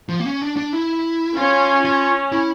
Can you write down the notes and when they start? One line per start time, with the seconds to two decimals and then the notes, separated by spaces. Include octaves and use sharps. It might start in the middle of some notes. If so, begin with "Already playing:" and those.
0.09 F3
0.20 A#3
0.26 C#4
0.42 D4
0.57 D4
0.73 E4
1.37 C#4 F4
1.85 F4
2.32 E4